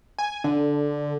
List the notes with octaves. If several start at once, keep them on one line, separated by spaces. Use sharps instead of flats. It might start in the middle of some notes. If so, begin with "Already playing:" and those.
G#5
D3